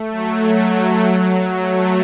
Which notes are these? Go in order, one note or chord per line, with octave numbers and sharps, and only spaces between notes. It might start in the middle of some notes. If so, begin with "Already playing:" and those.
Already playing: A3
F#3
A3